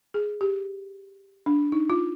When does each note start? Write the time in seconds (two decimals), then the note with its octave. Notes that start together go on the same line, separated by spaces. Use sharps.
0.14 G#4
0.41 G4
1.46 D4
1.72 D#4
1.90 F4